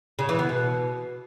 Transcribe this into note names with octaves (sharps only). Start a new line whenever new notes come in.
C#3
E3
B3
B2